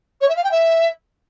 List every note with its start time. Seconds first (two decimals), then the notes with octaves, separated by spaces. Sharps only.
0.20 C#5
0.28 E5
0.36 F5
0.43 G5
0.51 E5